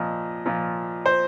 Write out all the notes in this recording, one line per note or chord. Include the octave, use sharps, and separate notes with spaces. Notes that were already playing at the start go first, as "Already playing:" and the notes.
Already playing: A#2 F3 D#5
A#2 F3
C5